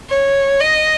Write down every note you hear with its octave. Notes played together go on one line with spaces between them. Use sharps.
C#5
D#5